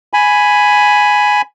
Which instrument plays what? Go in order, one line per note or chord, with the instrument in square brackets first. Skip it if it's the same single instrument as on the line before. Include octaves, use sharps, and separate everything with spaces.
[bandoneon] G#5 B5